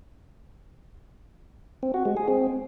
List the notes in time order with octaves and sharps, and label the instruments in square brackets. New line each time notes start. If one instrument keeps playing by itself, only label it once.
[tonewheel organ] C4
F#4
G#3
G#4
C4